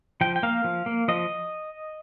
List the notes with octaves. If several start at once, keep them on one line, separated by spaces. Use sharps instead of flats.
F3 G5
G5
A#3 F5
F3
A#3
F3 D#5